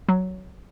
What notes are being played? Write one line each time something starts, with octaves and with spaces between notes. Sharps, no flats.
F#3